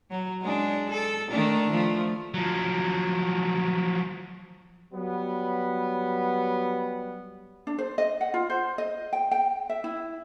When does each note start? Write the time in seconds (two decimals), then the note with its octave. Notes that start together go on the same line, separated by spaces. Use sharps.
0.11 F#3
0.42 G#3 D4
0.91 A4
1.32 D#3 A3 D4
1.71 F3 A3
2.34 F3 F#3
4.93 F#3 G3 B3
7.67 D4
7.78 C5
7.98 D#5
8.21 F#5
8.34 F4
8.50 C5
8.78 D#5
9.13 G5
9.31 G5
9.69 E5
9.84 E4